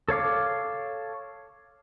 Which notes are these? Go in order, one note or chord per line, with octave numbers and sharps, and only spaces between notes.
A4 C#5 F5 D6